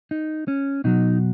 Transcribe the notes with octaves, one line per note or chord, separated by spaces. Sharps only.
D#4
C#4
B2 F#3 D#4